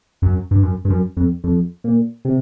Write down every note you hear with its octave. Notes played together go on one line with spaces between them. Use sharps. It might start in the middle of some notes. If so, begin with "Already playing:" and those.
F#2
G2
F#2
G2
F#2
F2
F2
A#2
C3